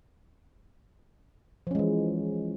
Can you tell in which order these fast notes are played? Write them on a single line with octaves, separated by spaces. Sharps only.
F3 C#4 G#3 E3